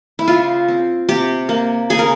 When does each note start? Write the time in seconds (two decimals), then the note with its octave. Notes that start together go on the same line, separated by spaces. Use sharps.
0.19 E4
0.28 C#3 F4
0.68 C4
1.09 C3 G4
1.49 A#3
1.90 C#3 G#4
1.99 A#4